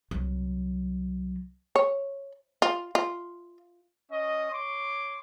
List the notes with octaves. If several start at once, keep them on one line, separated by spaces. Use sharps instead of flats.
C2 F#3
C#5
F4
F4
C#4 D#5
C#5 C6 D6